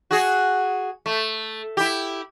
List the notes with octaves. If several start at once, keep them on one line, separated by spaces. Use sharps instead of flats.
F#4 G#4
A3
E4 G4